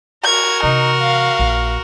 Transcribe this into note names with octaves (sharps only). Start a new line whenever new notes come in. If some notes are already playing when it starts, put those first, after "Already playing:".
F#4 A#4 G#6
C3 E3 D#4
F5
A#1